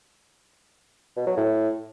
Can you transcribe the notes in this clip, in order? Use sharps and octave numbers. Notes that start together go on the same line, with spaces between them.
B2
F#3
A2